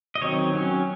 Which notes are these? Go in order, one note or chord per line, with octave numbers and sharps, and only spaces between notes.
D#5
D#3 F#3 C4 C#5
F#3 C#4